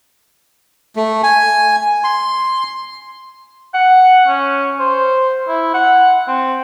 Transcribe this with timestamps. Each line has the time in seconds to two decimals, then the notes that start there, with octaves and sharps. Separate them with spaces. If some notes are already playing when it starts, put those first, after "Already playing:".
0.96 A3
1.23 G#5
2.04 C6
3.74 F#5
4.28 C#4
4.80 C5
5.48 E4
5.74 F#5
6.28 C4